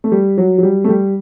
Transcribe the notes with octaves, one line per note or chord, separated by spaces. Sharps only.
A3
G3
F#3
F#3
G3
A3
G3